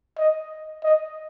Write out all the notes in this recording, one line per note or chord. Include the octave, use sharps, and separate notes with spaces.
D#5
D#5